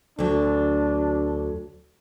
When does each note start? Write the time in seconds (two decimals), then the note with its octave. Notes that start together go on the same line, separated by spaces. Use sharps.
0.19 D2 F#3 D4